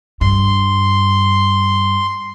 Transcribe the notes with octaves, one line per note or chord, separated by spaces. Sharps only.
G2 C6